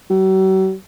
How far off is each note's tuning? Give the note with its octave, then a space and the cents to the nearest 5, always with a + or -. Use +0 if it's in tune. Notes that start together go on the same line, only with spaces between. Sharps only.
F#3 +45